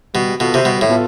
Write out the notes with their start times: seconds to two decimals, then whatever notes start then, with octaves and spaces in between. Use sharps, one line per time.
0.14 B2 G3
0.40 B2 B3 F4 A4
0.54 C3
0.65 B2 G3
0.81 A2
0.89 B3 F4 A4